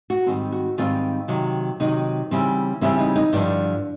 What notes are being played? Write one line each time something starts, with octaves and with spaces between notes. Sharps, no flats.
F#4
G#2 D#3 G3 C4
F#4
G#2 D#3 G3 C4 F4
C3 D#3 F#3
C3 D#3 F#3 D#4
C#3 E3 G3 C4
C#3 E3 G3 C4 E4
D#4
D#4
G2 D3 F3 D4